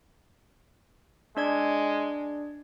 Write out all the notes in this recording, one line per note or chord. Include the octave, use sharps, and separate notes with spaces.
G#3 D4 D5 G#6